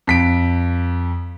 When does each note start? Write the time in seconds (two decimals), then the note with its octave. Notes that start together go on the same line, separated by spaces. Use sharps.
0.07 F2 B6 D7